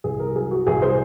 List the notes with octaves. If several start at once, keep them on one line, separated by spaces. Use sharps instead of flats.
C2 G#4
A#4
F#3 G#4
F#4
C2 G#4
C5